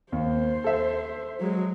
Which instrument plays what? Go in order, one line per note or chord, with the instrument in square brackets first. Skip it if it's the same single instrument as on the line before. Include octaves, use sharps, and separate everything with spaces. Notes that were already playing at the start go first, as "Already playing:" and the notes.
[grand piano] D#2 [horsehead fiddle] C5
[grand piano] A4 E5
[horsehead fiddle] F#3 G#3